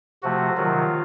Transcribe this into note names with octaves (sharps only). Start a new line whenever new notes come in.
C3 F3 A3 F#4
C3 D#3 F#3 F4